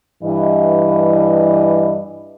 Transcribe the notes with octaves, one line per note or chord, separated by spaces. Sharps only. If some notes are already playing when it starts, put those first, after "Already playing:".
G2 E3 D#5